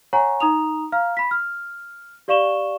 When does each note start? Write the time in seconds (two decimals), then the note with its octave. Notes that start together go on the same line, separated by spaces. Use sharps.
0.13 C#5 F#5 G#5 A#5 C#6
0.40 D#4 A#5 D#6 F7
0.92 F5 A#5 F6
1.17 B5 B6
1.31 F6
2.28 G4 D5 F5 C#6 E7 G7